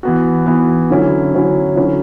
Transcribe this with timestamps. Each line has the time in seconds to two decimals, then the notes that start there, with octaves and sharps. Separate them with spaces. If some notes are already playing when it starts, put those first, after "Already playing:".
0.03 E3 B3 F#4
0.46 E3 B3 F#4
0.90 D3 F#3 C#4 E4
1.34 D3 F#3 C#4 E4
1.76 D3 F#3 C#4 E4